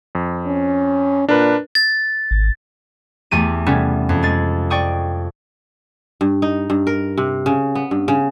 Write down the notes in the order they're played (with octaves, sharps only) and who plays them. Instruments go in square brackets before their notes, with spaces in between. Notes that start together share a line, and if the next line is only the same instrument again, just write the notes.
[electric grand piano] F2
[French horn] C#4
[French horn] A#2 [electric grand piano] D4 A#4 B4
[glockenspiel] A6
[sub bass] G#1
[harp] E2 A3 G4 D#7
C3 G3 B3 C#4 G#4 A4
F2
G#3 G#4 A6
D5 G5 C#6 D#6
[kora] G2
D#4
G2
A#4
C3
C#3
B3
G2
C#3